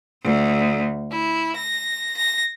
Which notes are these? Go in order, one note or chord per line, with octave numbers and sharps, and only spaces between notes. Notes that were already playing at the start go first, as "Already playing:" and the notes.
D2
E4
A#6
A#6